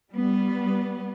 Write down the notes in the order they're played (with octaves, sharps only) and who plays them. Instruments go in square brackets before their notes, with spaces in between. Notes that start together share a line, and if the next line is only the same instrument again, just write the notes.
[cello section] G3 B3